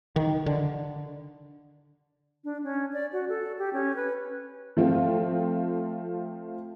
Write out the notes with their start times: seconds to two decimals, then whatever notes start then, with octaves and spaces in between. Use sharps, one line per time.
0.16 D#3
0.46 D3
2.44 D4
2.64 C#4
2.93 D5
3.13 F#4
3.29 A4
3.59 G4
3.73 C#4
3.96 B4
4.77 F3 A3 C4 F4